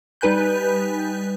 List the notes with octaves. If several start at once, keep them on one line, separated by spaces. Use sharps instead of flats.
G3 D#4 B4 G#5 F#6 G6